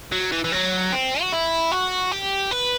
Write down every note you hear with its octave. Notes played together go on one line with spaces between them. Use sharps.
F#3
E3
E3
F#3
C4
F#4
E4
F#4
G4
B4